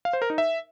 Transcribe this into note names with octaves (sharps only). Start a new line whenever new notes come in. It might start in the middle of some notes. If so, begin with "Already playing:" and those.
F5
C5
A#4
D#4
E5